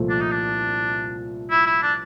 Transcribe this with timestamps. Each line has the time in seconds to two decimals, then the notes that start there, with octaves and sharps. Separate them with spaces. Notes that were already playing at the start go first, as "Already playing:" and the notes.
Already playing: C2 A#2 F3 A3
0.09 D4
0.21 D#4
0.31 D4
1.51 E4
1.66 E4
1.82 D4